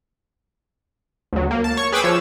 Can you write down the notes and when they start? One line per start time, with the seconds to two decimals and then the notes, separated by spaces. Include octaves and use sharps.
1.33 D2 F#3
1.51 A#3
1.64 A5
1.77 C#5 C#6
1.92 G#4 B4 G5 B5 D6 E6
2.04 F3 C#5 E6